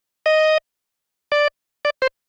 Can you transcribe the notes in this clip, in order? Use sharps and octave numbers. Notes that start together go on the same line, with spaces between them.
D#5
D5
D5
C5